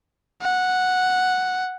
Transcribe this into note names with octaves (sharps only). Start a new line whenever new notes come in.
F#5